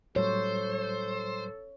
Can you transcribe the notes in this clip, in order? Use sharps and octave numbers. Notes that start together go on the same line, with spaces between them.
A2 F#3 G3 A4 C5 C#5